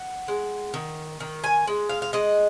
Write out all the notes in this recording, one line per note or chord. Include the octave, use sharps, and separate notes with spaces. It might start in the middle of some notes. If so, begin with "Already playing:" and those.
Already playing: F#5
G#3
D#3
D#3
G#5
G#3
F5
F5
G#3 D#5